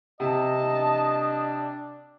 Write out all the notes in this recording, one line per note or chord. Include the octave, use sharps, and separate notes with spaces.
C3 D#5 A5
D4